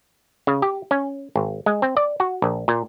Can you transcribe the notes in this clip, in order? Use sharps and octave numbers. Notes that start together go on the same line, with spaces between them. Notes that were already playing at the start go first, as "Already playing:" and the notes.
C#3
G4
C#4
G#1
G#3
C4
D5
F#4
A#1
A#2